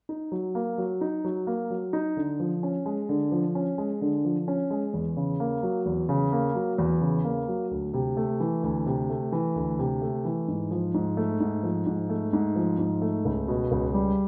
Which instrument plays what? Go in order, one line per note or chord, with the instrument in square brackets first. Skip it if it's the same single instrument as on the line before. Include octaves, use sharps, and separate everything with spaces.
[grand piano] D#4
F#3
A#3
F#3
D#4
F#3
A#3
F#3
D#4
D3
F3
C#4
G#3
D3
F3
C#4
G#3
D3
F3
C#4
G#3
E2
C#3
A#3
F#3
E2
C#3
A#3
F#3
E2
C#3
A#3
F#3
D2
C3
A3
E3
D2
C3
A3
E3
D2
C3
A3
E3
G#2
F3
G#2
A3
G#2
F3
G#2
A3
G#2
F3
G#2
A3
C#2
B2
C#2
G3